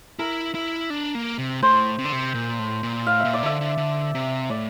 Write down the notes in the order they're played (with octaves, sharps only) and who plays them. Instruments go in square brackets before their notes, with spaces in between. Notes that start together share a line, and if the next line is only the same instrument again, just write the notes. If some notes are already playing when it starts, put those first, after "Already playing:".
[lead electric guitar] E4 [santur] A#4
[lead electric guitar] E4
D4
A#3
C3
[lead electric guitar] A2 [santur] C5
[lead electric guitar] C3
D3
C3
A#2
A2
A#2
[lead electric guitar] A2 [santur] F5
[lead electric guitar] A#2 [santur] E5
[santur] D5
[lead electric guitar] D3 [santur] E5
[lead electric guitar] D3
D3
C3
[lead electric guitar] A2 [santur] D5